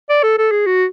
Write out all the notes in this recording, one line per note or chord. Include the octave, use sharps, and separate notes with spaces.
D5
A4
A4
G#4
F#4